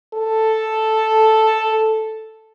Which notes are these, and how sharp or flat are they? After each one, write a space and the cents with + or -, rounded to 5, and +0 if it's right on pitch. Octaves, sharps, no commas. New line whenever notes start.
A4 +0